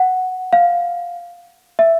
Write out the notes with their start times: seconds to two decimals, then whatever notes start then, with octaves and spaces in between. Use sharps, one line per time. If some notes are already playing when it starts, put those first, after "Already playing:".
Already playing: F#5
0.53 F5
1.79 E5